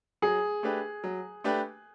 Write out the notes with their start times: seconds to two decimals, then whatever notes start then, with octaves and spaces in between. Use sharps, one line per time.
0.22 F#3 G#4
0.63 A3 D4 G4 B4
1.04 F#3
1.44 A3 D4 G4 B4